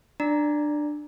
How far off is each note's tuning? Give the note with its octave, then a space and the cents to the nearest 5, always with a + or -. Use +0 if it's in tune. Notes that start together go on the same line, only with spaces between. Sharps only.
D4 +20 D5 +0 A#5 +0